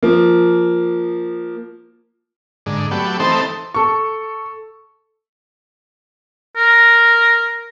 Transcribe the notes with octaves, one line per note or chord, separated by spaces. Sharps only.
F3 A#3
G#2 D3
F#3 A3 B3 G4
E3 A3 C4 D#4 A4 C5
A4 C#6
A#4